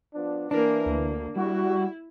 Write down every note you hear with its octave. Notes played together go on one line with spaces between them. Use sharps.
F3 B3 D4
E3 A#3 D4 A#4
D2 A#3
G3 E4 F#4